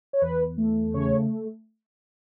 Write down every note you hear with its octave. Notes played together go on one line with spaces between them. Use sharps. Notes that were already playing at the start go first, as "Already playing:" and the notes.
C#5
E2 B4
A3
C#3 C#5